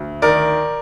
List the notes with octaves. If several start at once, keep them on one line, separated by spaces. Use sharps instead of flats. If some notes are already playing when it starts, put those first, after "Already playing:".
Already playing: D2
D#3 A#4 D5